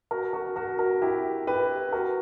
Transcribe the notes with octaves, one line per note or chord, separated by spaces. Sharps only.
F#4 A#4
F#4 A#4
F#4 A#4
F#4 A#4
E4 G4
G4 B4
F#4 A#4